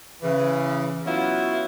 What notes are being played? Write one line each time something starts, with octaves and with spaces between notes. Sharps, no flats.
C#3 E3
F#3 B3 C#4 E4 F4